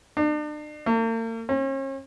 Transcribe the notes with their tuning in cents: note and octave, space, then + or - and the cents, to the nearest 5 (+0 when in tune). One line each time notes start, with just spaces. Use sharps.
D4 +40
A#3 -45
C#4 -40